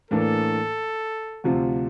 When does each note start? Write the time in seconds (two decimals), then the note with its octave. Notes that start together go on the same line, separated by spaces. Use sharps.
0.11 A2 E3 A#3 D4 A4
1.44 D2 C3 F3 C4 F4